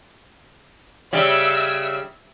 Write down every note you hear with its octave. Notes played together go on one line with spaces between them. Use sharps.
C#3 G3 E5 E6